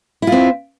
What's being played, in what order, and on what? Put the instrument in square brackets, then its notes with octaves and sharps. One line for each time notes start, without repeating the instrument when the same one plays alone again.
[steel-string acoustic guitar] E4
F4
C4